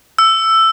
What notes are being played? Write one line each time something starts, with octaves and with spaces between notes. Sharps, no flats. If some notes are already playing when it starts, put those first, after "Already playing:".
E6